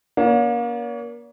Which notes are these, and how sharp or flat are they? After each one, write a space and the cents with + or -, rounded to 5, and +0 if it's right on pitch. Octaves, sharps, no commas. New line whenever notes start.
A#3 +30 C#4 +45